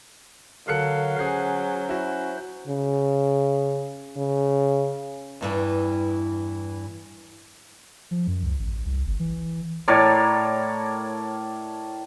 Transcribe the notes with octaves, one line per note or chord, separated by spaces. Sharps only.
D3 F#3 A4 A#4 F5 F#6 C#7
C#4 G#4 C5 C7
E4 F#4
C#3
C#3
E2 G2 E3
F3
F#2
C#2
A1
C2
G1
E3
A2 A#4 C#5 D5